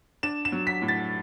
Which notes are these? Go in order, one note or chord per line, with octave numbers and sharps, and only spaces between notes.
D4 E7
E7
F#3
B6
A2
A6